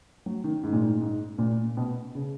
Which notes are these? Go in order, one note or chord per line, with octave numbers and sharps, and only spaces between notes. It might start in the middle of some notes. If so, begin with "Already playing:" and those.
F#3
D#3
G#2
A#2
G#2
G#2
A#2
B2
C#3